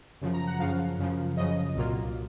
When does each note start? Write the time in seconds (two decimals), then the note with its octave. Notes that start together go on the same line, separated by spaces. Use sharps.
0.21 F#2 C#3 F3
0.34 A#5
0.47 F#5
0.59 F#2 C#3 F3 F5
0.99 F#2 C#3 F3
1.37 F#2 C#3 F3 D#5
1.75 C2 A#2 F#3 A#3 F4